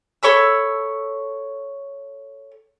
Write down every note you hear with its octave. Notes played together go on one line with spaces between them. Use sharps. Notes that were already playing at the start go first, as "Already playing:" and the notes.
A4 C#5 B5 E6